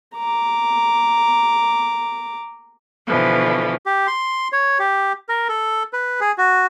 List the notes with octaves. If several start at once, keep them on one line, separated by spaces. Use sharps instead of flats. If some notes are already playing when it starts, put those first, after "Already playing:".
A#5 D6
B2 D3 E3 F3
G4
C6
C#5
G4
A#4
A4
B4
G#4
F#4